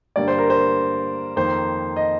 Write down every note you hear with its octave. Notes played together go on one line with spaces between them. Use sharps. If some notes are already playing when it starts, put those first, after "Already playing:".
G2 D3 G3 A#3 D5
C5
A#4
C5
F2 D#3 A#3 C5
D#5